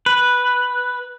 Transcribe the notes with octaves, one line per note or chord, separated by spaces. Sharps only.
B4